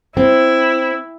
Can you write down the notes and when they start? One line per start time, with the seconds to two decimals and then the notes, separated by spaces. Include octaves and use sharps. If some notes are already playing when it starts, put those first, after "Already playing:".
0.17 C4 E4